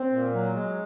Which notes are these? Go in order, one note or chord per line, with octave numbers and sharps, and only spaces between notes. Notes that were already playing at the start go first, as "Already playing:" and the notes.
Already playing: C4
A#2
F#3
G#3